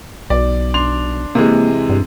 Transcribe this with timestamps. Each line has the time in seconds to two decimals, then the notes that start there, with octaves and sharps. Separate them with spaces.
0.30 B1 D5
0.74 D4 C6 F7
1.35 C3 E3 G#3 A#3
1.89 G2